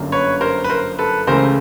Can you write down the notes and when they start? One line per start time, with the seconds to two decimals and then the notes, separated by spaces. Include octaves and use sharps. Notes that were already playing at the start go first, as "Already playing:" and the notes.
Already playing: G1 F#2 D3 F#3 A#3
0.12 B4 C#5
0.41 A#4 C5
0.64 B4
0.70 A#4 C5
0.99 A4 B4
1.27 C#2 C#3 E3 A3 A#4 C5